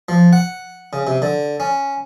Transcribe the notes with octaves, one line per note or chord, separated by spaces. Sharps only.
F3
F#5
C#3
C3
D3
C#4